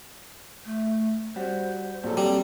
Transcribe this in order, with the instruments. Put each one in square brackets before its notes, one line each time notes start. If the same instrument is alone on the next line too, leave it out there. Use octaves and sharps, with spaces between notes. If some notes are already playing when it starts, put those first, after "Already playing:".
[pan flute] A3
[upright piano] G3 F#4 [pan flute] C5
[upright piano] A#1 F#3 A4
[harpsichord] G3 [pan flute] C4